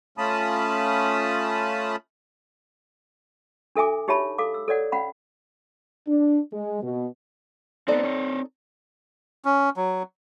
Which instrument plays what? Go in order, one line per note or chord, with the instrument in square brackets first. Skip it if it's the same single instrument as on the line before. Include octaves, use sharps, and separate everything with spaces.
[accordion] A3 C#4 F4 A5 B5 D#6
[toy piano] D4 A4 E5 G#5 D6
D#4 G4 C#5 E5 A5 B5
A4 F5 D6
E6
A4 C#5 D5 F#5
C#4 F5 F#5 B5
[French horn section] D4
G#3
B2
[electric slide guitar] B3 C4 [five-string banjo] D#4 A4 D5
[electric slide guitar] C4 C#5
[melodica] C#4
F#3